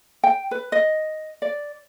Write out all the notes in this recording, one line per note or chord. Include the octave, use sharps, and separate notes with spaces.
G5
B4
D#5
D5